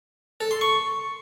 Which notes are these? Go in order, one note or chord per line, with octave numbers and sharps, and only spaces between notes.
A4
C6
C#6